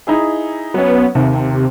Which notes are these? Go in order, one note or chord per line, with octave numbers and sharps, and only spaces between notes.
D#4 E4 G#4
F#3 B3 C#4
D#2 C3